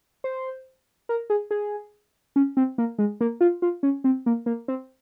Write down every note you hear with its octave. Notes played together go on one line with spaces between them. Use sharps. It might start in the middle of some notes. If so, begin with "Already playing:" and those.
C5
A#4
G#4
G#4
C#4
C4
A#3
G#3
A#3
F4
F4
C#4
C4
A#3
A#3
C4